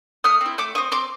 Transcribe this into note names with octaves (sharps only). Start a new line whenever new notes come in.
A3 D#6 F6
C4 E4
A3 D6 E6
C4 E4 C#6 D#6
C4 C6 D6